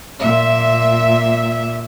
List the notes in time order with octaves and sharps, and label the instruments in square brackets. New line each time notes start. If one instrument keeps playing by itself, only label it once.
[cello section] A#2 E5